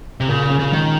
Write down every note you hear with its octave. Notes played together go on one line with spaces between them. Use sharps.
C3
A#2 C#3
C#4
C#3
D#3 G#3